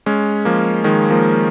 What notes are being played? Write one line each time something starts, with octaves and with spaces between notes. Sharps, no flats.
G#3 C#4
F3 A#3
D#3 G#3
F3 A#3